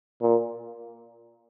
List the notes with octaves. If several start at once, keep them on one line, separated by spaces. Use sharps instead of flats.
A#2